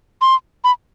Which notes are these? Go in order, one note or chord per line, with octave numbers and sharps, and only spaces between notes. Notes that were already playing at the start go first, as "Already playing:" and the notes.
C6
B5